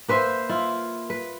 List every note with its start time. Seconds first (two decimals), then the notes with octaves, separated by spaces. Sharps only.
0.08 A#3 B4 C5 E5
0.49 E4 F4
1.10 B4